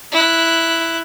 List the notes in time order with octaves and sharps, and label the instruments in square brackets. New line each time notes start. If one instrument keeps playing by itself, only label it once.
[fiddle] E4 F#6